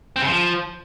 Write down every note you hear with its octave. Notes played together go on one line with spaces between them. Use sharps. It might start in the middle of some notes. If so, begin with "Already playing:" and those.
C4
C#3
F3